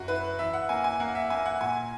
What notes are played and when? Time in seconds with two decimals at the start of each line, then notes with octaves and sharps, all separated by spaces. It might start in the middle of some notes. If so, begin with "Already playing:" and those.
Already playing: F#2 F#4
0.08 E4 B4
0.39 E3 E5
0.53 F#5
0.69 A#3 G#5
0.84 G#5
1.00 A#3 F#5
1.15 E5
1.30 A#3 G#5
1.46 F#5
1.61 A#2 G#5